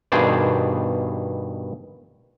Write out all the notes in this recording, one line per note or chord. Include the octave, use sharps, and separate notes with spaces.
G2 B2 D#3 G#4 C5 D5